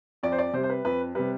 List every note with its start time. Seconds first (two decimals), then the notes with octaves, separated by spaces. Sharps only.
0.23 F2 D5
0.32 C5
0.39 D5
0.53 C3 C5
0.57 G3
0.63 C5
0.70 B4
0.85 F2 B4
1.15 C3 G3 B4